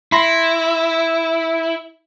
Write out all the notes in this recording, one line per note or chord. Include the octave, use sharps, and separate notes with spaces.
E4 B5 C6 A#6